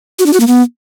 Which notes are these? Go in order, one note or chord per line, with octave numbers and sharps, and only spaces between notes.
F#4
D4
F#4
A#3
B3